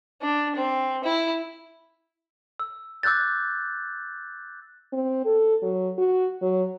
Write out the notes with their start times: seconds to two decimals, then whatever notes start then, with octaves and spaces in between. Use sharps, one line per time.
0.22 D4
0.56 C4
1.04 E4
2.59 E6
3.03 D6 E6 F#6 G6 A6
4.93 C4
5.25 A4
5.62 F#3
5.98 F#4
6.42 F#3